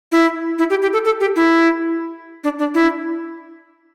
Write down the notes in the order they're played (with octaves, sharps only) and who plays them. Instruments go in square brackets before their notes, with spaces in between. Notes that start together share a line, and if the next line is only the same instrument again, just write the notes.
[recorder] E4
E4
G4
G4
A4
A4
G4
E4
D4
D4
E4